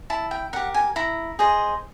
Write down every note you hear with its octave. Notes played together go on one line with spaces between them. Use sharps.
E4 A5
G5
G4 A#4 F#5
G#5
E4 A#5
G#4 C5 D#5